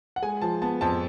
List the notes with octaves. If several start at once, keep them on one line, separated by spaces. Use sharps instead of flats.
F#5
G#3 G#5
F3 A5
B3 A5
F2 A5